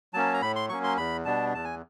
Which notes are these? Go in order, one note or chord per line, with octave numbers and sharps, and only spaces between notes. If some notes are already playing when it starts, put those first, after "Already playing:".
F#3 A#3 C#4 A5
A#5
A2 B5
C6
F#3 A#3 C#4 C#6
C6
E2 B5
B2 G3 B3 D4 A5
E2 A5
G#5